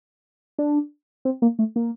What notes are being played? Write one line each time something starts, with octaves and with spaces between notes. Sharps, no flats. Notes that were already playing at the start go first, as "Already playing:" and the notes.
D4
C4
A#3
A3
A#3